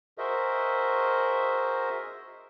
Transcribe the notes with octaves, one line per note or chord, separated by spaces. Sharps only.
F#4 G#4 A#4 C5 D#5 E5